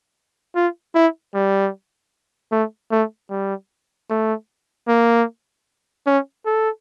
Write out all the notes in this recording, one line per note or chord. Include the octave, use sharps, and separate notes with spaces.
F4
E4
G3
A3
A3
G3
A3
A#3
C#4
A4